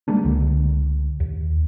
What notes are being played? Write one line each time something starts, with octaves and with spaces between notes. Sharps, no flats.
G3 G#3 A#3 D4
C#2 D3
D#2